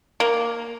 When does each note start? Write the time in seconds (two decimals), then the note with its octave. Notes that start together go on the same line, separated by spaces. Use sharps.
0.20 A#3